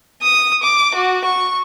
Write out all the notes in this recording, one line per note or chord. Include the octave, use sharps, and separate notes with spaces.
D#6
D6
F#4
C#6